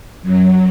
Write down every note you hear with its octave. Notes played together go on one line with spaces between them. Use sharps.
F#2 F#3